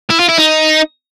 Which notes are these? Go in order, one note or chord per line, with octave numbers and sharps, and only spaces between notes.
E4
F4
E4
D#4